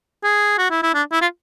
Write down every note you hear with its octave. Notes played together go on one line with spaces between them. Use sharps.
G#4
F#4
E4
E4
D4
E4
F4